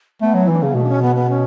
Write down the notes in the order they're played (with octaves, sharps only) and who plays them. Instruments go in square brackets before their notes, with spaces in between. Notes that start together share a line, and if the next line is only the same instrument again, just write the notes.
[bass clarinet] A3 [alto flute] B3
[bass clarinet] F#3
[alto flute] E4
[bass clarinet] E3
[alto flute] D4
[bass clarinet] C#3 [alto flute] C#4
[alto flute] B3
[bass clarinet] B2 [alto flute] A3
[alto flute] D4
C#4
B3
B3
C#4